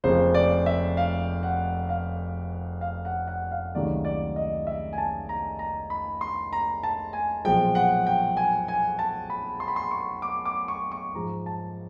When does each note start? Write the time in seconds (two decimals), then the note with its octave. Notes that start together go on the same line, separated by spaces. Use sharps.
0.04 F1 F2 C#3 F3 A#3 C5
0.34 D5
0.66 E5
0.97 F5
1.43 F#5
1.89 F5
2.81 F5
3.05 F#5
3.28 F#5
3.51 F5
3.74 C#2 C3 D#3 F#3 A3 D5
4.05 D5
4.36 D#5
4.67 E5
4.93 G#5
4.98 A5
5.29 A#5
5.59 A#5
5.90 B5
6.21 C6
6.53 A#5
6.83 A5
7.13 G#5
7.44 B1 A#2 F3 G#3 G5
7.75 F#5
8.07 G5
8.37 G#5
8.68 G#5
8.99 A5
9.30 B5
9.60 C6
9.68 B5
9.76 C6
9.91 C#6
10.22 D6
10.45 D6
10.68 C#6
10.92 C#6
11.15 G#2 F3 G#3 A#5
11.46 A5